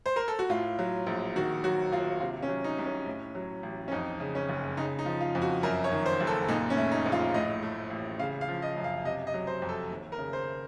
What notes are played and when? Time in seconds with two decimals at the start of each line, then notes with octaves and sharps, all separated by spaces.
0.06 C5
0.16 A#4
0.28 A4
0.39 F#4
0.49 A2 F4
0.79 F#3
1.07 A#1
1.36 D#3 F#4
1.64 F#3 F#4
1.92 D#2 F4
2.20 C3 F4
2.43 C#4
2.49 F#3
2.64 D#4
2.78 C2
2.86 C#4
3.06 A2
3.35 F#3
3.63 A1
3.88 C#4
3.91 F2 D#4
4.20 C#3
4.35 C#4
4.49 F#1
4.77 C#3 D#4
4.99 D#4
5.05 F3
5.21 F4
5.35 F2
5.42 F#4
5.63 F#2 A#4
5.84 C#5
5.91 D#3
6.06 C5
6.20 F#1
6.27 A4
6.48 A#2 D#4
6.70 C#4
6.77 A3
6.91 D#4
7.06 A#1
7.12 F4
7.34 A2 D#5
7.63 A3
7.90 A1
8.19 C#3 F5
8.41 F5
8.48 F3
8.62 D#5
8.77 F#2
8.84 F5
9.04 C3 D#5
9.27 D#5
9.34 F#3
9.47 C5
9.62 F2
9.69 A4
9.90 D#2
10.12 A#4
10.18 C#3
10.33 C5